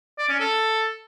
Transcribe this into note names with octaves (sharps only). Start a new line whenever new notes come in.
D5
C#4
A4